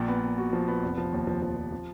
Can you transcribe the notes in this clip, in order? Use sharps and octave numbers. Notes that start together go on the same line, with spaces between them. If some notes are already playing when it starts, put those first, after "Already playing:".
Already playing: A#1 A#2
B3
A#2
F#4
F3
B3
F1
F3
D#2
F3
F3
F3
F3